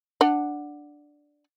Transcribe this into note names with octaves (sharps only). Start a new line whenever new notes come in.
D4 F#5